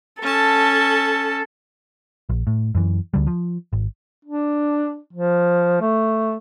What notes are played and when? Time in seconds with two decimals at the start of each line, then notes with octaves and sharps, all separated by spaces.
0.22 C#4 A4 A5
2.29 A#1
2.47 A2
2.75 F#2 E3
3.14 D2 D3 G3
3.27 F3
3.73 G#1
4.25 D4
5.13 F3
5.81 A3